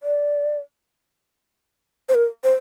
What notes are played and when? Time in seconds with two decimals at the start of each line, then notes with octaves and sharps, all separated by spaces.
0.03 D5
2.09 C5
2.15 A#4
2.44 C5